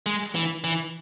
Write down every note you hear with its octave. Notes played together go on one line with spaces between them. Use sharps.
G#3
E3
E3